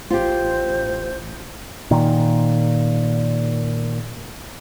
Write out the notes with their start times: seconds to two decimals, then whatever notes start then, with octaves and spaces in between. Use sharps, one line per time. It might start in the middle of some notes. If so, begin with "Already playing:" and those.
0.10 A1 F4 G4 C5
1.91 A#2 D#3